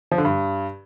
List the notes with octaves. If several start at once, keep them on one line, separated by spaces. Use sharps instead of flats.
F3
D3
G2